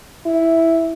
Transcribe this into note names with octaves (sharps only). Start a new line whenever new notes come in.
E4